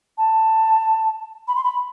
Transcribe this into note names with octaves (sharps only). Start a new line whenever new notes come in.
A5
B5
C6
B5